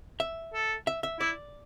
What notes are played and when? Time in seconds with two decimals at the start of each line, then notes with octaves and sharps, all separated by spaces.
0.20 E5
0.54 A4
0.87 E5
1.03 E5
1.20 E4 D5